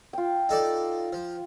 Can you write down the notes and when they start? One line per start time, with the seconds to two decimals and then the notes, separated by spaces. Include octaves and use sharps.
0.13 F4 G5
0.49 D#4 A4 D5
1.13 F3